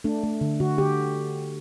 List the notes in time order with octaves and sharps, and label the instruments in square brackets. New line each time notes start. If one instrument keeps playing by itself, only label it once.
[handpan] A3 D4
A3
D3
D3 F#4
D3 G4